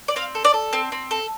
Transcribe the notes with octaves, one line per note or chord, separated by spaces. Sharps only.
D5
C4 F5
A4
D5
A4
C4
C4
A4